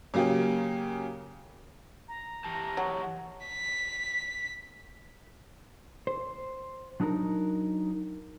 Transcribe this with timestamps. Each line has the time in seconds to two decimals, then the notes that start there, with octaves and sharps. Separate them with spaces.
0.14 C#3 F#3 A#3 G4 G#4
2.08 A#5
2.45 E3 G4 A5
2.77 F#3
3.46 B6
6.07 C5
7.00 F#3 D4 D#4 F#4 A#4